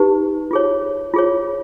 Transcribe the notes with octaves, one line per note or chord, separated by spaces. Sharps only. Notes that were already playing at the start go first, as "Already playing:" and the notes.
Already playing: D#4 G4 B4
F4 G#4 C#5
F4 G#4 C#5